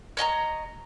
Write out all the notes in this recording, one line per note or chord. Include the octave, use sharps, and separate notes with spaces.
C#5 D#5 G#5 A#5